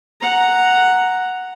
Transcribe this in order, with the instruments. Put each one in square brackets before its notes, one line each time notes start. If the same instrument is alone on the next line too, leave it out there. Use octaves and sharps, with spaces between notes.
[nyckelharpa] F#5 A#5